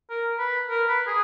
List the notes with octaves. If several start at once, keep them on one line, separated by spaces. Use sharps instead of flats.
A#4
B4
A#4
B4
G#4